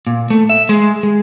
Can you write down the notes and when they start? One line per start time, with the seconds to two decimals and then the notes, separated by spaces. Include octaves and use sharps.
0.07 A#2
0.30 A3
0.49 E5
0.69 G#3
1.03 G#3